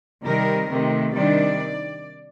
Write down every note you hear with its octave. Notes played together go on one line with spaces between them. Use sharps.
C3 D#3 G3 A#4
C3 D#3 A3
C3 D#3 G3 D4 D5